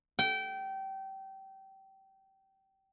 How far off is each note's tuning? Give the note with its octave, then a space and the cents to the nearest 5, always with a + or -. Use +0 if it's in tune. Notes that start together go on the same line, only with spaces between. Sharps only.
G5 -25